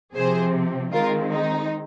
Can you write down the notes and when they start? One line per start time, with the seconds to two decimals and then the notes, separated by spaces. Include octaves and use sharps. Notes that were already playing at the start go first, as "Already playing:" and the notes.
0.14 C3 F3 C4 G#4 C5
0.92 D#3 G#3 C4 F4 A#4
1.32 D#4